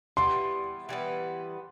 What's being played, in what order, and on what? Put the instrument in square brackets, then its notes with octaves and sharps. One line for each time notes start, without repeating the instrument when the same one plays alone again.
[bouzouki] E3 G3 B3 [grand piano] C6
[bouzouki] E3 G3 B3